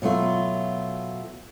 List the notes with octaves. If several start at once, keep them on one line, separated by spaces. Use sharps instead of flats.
B2 F#3 A3 F4